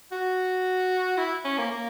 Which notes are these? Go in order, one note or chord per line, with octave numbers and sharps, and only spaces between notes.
F#4
E4
C#4
A#3
A#3